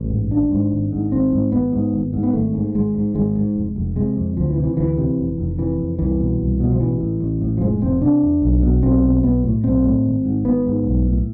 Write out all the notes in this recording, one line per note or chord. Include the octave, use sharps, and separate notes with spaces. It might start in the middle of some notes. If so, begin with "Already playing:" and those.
Already playing: A1
G#2
G#1 D4
G#2
G#1
G#2
G#1 C4
G#2
G#1 B3
G#2
G#1
G#2
B3
G#1 A3
G#2
G#1 G#3
G#2
G#1 G#3
G#2
F1
F1
C3 G#3
F2
D2 F3
E3
C3
E3
D2 E3
C3
F1
F1
C3 E3
F2
C2 E3
B2
C2
B2
F3
A1 E3
A2
A1
A2
F3
F1 G#3
F1 C4
C3 D4
E2
B1
B2
B1 C4
B2
B1 B3
A2
B1 C4
A2
G#1
G#2
G#1 B3
G#2
B1
A2